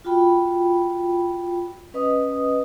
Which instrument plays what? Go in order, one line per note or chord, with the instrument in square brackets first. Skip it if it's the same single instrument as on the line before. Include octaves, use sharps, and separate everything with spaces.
[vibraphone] F4 F#4 G5 B5
C#4 B4 D#5 D#6